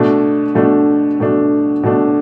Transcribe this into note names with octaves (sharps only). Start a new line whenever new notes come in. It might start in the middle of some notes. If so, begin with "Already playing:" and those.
Already playing: B2 A3 D4
B2 A3 D4
B2 A3 D4
B2 A3 D4